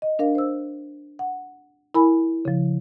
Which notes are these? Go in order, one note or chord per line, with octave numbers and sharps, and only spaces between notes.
D#5
D4 A#4 F5
C5 E6
F#5
E4 A#4 G#5 B5
C#3 F3